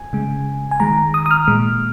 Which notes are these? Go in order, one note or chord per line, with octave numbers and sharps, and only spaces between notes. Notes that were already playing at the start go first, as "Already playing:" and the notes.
Already playing: G#5
C#3 G#3
G#5
D#3 G#3 A#5
D#6
D#6
F6
A#2 G#3